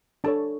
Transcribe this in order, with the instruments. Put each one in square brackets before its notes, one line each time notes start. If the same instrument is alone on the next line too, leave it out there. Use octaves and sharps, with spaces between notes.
[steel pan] D4 A4 C#5 A5